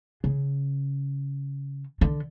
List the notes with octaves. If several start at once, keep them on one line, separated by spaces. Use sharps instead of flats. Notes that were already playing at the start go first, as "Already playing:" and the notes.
C#3
D3